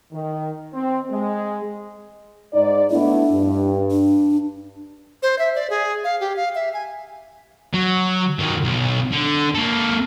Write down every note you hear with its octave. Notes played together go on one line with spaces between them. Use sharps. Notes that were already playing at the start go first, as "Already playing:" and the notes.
D#3
C4
G#3
G#2 D#4 D5
A3 B3 D4 E4
G2
D4
C5
E5
D5
G#4
F5
G4
F5
E5
G#5
F#3
D#3 F#3
B1
D3
A#3 A4